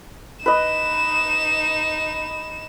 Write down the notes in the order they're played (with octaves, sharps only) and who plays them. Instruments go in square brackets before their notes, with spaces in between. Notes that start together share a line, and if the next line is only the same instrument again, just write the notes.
[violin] D#4 E7 [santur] B4 D#5